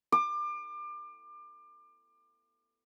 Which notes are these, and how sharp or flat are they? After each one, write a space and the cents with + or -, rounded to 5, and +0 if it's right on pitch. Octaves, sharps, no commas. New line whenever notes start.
D6 +30